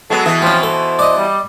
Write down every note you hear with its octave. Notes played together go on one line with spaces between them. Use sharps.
F#3 G#3 B3 A4
B2 E3 G#4
F3 C4 C#4
A4 C5
D5 D#5
G3